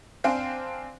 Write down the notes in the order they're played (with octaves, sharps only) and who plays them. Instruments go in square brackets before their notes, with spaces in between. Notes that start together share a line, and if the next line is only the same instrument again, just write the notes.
[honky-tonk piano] C4 D4 C5 F5 G5 G#5